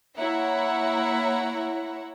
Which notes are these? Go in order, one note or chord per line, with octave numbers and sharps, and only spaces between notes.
A#3 E4 C#5 E5 F#5 A#5